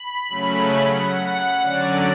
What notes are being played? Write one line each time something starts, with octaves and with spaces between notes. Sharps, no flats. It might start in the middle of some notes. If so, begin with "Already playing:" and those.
Already playing: B5
C#3 F#3 A3 C#4
F#5
D3 F#3 C#4 D5